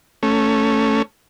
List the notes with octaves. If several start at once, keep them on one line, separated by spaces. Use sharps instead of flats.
A3 C#4